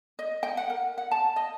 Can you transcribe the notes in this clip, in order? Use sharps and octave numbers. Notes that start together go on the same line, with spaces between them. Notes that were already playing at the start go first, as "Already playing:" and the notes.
D#5
G5
F#5
A#4
F#5
A5
D#5